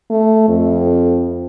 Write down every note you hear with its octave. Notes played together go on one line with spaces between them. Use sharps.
A3
F2